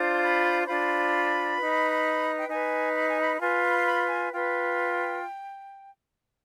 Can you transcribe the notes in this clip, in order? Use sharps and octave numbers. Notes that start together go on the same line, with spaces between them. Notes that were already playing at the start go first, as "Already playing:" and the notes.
Already playing: D4 F4 C5
C6
B5
C6
D4 F4 C5 B5
D#4 B4
G5
D#4 B4 G#5
B5
G#5
B5
B5
F4 B4 G#5
C6
B5
C6
B5
G#5
F4 B4 G5